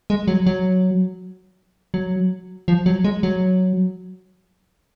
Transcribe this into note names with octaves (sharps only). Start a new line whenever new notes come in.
G#3
F#3
F#3
F#3
F3
F#3
G#3
F#3